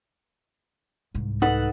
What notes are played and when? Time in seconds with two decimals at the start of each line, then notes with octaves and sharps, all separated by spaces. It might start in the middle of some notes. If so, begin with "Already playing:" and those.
1.15 C2 G#2
1.42 D#4 A4 B4 F#5